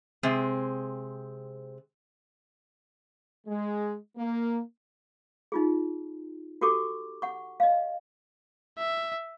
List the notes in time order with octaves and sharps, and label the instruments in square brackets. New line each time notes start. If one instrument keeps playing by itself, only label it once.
[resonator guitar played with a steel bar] C3 G#3 C4 G#4
[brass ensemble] G#3
A#3
[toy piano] D#4 F4 G#4
F#4 G4 A4 C#6 D6
F#5 C#6
D#5 F5
[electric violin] E5